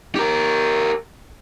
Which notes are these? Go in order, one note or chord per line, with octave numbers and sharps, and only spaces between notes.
G4 A#4